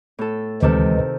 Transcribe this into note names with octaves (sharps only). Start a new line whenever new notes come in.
A2 A4
D2 C3 D#3 E3 G#3 A4